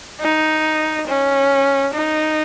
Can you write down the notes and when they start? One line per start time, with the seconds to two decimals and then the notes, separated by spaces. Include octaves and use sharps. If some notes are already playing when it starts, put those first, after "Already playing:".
0.20 D#4
1.07 C#4
1.94 D#4